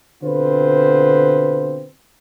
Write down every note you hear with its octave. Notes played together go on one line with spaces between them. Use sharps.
B2 D3 C4 F4 B4 C5